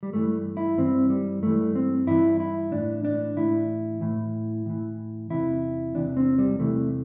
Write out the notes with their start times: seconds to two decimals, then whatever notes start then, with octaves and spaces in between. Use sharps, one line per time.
0.03 G3
0.13 G2 E3 A3
0.57 E4
0.78 G2 E3 C4
1.10 G3
1.43 G2 E3 A3
1.75 C4
2.07 G2 E3 E4
2.40 E4
2.72 A2 E3 D4
3.05 D4
3.37 A2 E3 E4
4.01 A2 E3
4.66 A2 E3
5.30 E2 C3 E3 E4
5.95 E2 C3 E3 D4
6.17 C4
6.39 G3
6.59 E2 C3 E3 A3